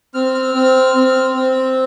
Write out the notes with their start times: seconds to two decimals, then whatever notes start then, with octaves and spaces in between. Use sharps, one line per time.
0.14 C4 F6
0.54 C4
0.95 C4
1.34 C4